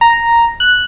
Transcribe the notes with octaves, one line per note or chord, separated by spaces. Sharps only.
A#5
F#6